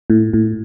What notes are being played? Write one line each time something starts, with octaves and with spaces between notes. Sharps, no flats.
A2
A2